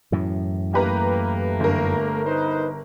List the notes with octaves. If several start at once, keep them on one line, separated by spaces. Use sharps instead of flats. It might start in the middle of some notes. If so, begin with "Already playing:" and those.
F#2 A2 E3
A3 A#3 G4 B4 A#5
G1 A#4
D#4 B4 C5